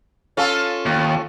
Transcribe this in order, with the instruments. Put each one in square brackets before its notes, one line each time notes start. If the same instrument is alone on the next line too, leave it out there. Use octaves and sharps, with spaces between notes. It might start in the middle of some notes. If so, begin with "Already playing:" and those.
[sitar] C#4 F4 A4
[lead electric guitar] D#2